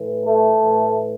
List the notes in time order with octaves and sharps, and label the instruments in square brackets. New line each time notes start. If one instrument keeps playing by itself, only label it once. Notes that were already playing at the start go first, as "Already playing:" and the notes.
Already playing: [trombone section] A2 E3
A3
A2 E3